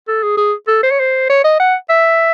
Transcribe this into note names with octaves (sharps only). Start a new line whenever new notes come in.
A4
G#4
G#4
A4
C5
C#5
C5
C#5
D#5
F#5
E5